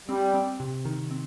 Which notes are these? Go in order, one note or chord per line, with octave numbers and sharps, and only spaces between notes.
G3 C4
C4
C3
D#3
C4